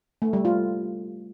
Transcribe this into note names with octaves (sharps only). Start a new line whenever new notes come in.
A3
G3
F4